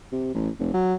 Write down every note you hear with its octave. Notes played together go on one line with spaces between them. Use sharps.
C3
A1
F1
F#3